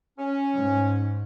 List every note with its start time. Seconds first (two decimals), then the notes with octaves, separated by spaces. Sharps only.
0.19 C#4
0.53 G#2